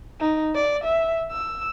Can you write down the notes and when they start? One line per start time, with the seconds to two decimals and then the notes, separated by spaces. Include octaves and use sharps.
0.20 D#4
0.55 D5
0.84 E5
1.31 E6